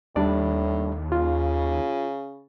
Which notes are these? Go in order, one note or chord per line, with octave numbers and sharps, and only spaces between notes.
D#2 A2 G3 D4 D5
C#3 F4